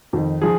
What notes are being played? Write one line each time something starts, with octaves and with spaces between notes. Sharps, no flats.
F2 D#3
F3 G#4